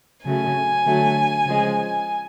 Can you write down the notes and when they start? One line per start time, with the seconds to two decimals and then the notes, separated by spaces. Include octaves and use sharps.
0.25 C#3 F#3 A3 G#5
0.85 D3 F#3 A3
1.45 C#3 F3 G#3